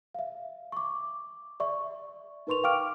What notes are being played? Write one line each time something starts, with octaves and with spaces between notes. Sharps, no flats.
E5 F5
C#6 D6
D5 E5 C#6
D#4 A#4 B4 C6 C#6 F7
F5 G5 C#6 D6 F6 D7